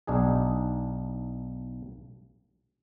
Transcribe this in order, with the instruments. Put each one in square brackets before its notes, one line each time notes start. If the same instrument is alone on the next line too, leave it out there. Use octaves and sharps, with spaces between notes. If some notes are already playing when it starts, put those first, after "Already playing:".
[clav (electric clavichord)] B1 D4 D#4 G#4